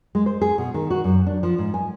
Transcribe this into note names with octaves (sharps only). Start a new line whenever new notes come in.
G#3
C5
G#4
B2
D#3
F#4
F#2
D4
F3
G#2
G#5